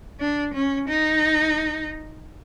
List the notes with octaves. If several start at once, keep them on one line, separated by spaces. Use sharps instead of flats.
D4
C#4
D#4